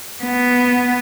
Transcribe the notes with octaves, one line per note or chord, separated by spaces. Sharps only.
B3